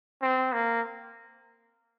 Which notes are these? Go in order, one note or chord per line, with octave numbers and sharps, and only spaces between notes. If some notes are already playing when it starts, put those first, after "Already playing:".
C4
A#3